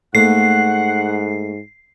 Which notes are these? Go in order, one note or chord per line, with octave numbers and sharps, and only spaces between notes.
G#2 A3 A#3 F#5 C7